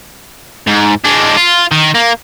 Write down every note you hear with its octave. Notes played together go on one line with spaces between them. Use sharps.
G#2
G#3 D4
F4
D#3
A#3